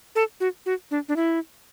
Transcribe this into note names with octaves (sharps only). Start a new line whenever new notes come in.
A4
F#4
F#4
D4
D4
E4